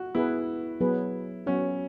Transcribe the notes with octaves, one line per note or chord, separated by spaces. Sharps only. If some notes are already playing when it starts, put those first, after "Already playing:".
Already playing: F#4
B3 E4 G#4 B4
F#3 B3 G#4 B4
F#3 B3 C#4 F#4